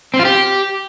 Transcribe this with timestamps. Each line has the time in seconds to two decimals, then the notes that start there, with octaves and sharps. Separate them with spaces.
0.14 C4
0.19 F4
0.25 G4